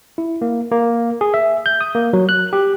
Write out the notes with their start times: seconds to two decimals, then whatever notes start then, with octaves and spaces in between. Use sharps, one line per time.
0.18 E4
0.42 A#3
0.71 A#3
1.21 G#4
1.34 E5
1.66 G6
1.81 D#6
1.95 A#3
2.13 F#3
2.29 F#6
2.53 G4